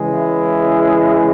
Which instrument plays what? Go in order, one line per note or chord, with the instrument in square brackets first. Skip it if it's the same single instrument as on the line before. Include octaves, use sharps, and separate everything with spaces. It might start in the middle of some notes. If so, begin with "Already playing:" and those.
Already playing: [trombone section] C#3 E3 G#3
E4